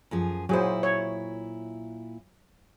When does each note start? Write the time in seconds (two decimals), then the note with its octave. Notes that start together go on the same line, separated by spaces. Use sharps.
0.11 F#2 F3 G#4
0.49 A#2 F#3 E4 G#4 C5
0.83 C#5